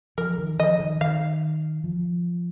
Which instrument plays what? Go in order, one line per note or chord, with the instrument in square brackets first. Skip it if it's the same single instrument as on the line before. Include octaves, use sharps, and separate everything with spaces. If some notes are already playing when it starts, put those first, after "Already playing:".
[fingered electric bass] F3 [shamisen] A#4
[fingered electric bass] D#3
[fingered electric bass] F3 [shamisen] D#5
[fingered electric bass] D#3
[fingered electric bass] D#3 [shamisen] F5
[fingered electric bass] F3